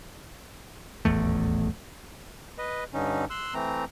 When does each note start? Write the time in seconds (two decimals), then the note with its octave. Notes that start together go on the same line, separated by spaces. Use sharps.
1.05 D#1 A1 E2 A3
2.58 B4 D#5
2.94 G2 D3 C#4 D#4
3.30 C6 E6 F#6
3.54 E3 A3 C4 A#5